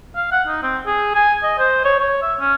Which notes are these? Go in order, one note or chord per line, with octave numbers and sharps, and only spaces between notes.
F5
F#5
D#4
C4
G#4
G#5
D#5
C5
C#5
C#5
E5
C#4